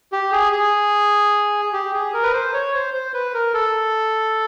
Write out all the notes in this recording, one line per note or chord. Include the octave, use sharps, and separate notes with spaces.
G4
G#4
G#4
G4
G#4
A#4
B4
C5
C#5
C5
C5
B4
A#4
A4